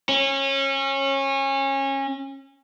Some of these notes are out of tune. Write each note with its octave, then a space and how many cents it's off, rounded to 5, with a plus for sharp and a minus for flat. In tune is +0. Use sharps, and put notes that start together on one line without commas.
C#4 -25